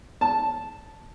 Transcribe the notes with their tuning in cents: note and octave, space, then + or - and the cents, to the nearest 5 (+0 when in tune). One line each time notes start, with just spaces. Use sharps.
A5 -5